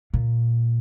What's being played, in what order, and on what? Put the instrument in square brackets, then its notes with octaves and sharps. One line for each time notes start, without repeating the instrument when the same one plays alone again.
[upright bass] A#2